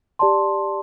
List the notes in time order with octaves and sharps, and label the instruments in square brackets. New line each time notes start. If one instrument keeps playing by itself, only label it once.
[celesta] G4 D5 A5 C6